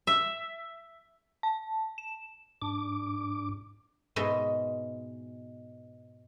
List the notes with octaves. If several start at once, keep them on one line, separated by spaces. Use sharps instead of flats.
E5
A5
E7
G#2 D4 D6
G#2 B2 G#3 D#5 E5